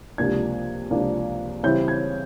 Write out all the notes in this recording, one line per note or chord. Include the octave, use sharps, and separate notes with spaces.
C#2 C3 F3 A#3 D4 G#6
C#2 C3 F3 A#3 D4
C#3 E3 G3 C4 E4 G6
G#6